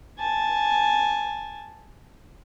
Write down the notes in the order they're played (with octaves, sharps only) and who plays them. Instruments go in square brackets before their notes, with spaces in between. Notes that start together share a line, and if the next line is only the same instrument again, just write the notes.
[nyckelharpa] G#5 A5